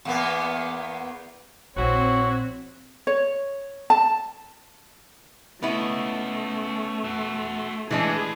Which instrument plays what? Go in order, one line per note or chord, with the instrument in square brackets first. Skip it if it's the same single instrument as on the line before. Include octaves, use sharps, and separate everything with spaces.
[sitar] E2 A#3 B3
[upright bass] A#1 [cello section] C4 [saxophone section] E4 F#4 [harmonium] C#5
[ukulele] C#5
A5
[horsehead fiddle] A3 [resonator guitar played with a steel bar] B3 E4 [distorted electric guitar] C#4 D#5
[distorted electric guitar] F#4 E5
[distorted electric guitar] A2 [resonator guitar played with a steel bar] E3 G#3 D4 [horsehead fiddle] G#4